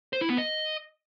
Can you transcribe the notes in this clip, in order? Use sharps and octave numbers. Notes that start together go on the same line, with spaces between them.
C5
E4
B3
D#5